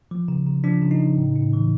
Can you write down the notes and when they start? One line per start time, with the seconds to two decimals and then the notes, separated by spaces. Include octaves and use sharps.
0.11 F3
0.28 C#3
0.46 C#3
0.64 F3 D4
0.82 C#3
0.91 D#4
1.00 C#3
1.18 A2
1.36 A2
1.53 E3